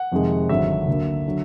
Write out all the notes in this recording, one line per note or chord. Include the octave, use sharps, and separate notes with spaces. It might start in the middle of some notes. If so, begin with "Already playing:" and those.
Already playing: F#5
F2 C3 D#3 G#3
G#1 G2 D3 F#3 E5
D2 D3 F#3 A#3
D3 F#3